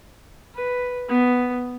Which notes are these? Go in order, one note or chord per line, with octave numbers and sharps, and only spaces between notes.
B4
B3